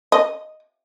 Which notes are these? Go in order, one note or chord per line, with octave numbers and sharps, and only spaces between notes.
D#5